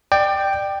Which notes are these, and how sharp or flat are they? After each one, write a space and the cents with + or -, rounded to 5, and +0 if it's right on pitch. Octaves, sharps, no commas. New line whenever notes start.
D5 +25 G5 +0